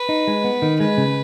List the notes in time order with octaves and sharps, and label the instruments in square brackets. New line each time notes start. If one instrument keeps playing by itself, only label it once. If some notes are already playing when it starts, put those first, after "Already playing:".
Already playing: [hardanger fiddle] B4
[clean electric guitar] D#4
G#3
B3
D#3
[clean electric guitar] G#3 [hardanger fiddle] B4
[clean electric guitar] C#3